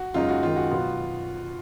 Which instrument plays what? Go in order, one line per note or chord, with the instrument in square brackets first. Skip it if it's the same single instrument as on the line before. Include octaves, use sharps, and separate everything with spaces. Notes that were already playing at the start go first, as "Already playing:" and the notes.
Already playing: [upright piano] F#4
[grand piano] F#2 C#3 G#3 D#4 [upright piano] F4
[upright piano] F#4
[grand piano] F#2 D#3 G#3 D#4 [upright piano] F4
[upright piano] F#4
[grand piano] B2 F#3 B3 F4